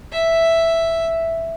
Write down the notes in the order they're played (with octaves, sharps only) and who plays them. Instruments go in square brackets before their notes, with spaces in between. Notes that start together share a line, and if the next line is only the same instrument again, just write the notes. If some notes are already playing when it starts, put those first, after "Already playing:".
[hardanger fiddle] E5